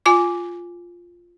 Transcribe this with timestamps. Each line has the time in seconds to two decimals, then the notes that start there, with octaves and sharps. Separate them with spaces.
0.06 F4 G#5 D6